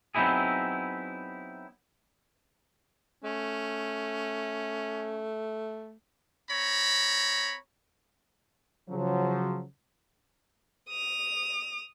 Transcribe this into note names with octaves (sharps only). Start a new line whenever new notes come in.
F#3 B3 C4 D#4 E4 G#4
A3 C#4
C4 C#5 A#5 B5
C#3 F3 F#3
D#6 F7